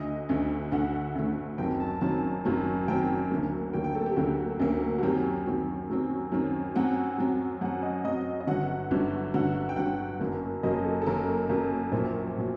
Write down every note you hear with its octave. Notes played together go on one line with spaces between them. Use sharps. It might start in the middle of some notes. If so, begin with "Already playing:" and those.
Already playing: D2 D3 A3 D#5
D2 D3 A3
D2 D3 A3 F#5
D2 D3 A3
F#1 F#2 D#3 F#3 C4 G5
A5
F#1 F#2 D#3 F#3 C4 A5
F#1 F#2 D#3 F#3 C4
F#1 F#2 D#3 F#3 C4 G5
D2 D3 F#3 A#3
D2 D3 F#3 A#3 G5
G5
A4
G4
D2 D3 F#3 A#3 F#4
D2 D3 F#3 A#3
F#4
F#2 D#3 F#3 C4 G4
F#2 D#3 F#3 C4
F#2 D#3 F#3 C4
F#2 D#3 F#3 C4
F#2 F#3 C4 F#5
F#2 F#3 C4
F#2 F#3 C4 F#5
D#5
F#2 F#3 C4 D#5
D#5
G1 G2 D3 F#3 F#5
G1 G2 D3 F#3
G1 G2 D3 F#3 F#5
F#5
G5
G1 G2 D3 F#3 F#5
F#1 F#2 F#3 A#3
F#1 F#2 F#3 A#3 D#5
A4
A4
F#1 F#2 F#3 A#3 A#4
F#1 F#2 F#3 A#3
A#1 A#2 F#3 C5
A#2 F#3